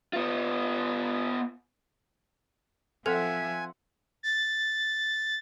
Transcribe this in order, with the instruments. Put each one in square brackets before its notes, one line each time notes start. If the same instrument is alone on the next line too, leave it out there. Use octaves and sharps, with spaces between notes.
[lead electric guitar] B3 F4
[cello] F3 E5 [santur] C4 F#5 E6 [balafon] A4 [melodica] G#5
[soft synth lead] A6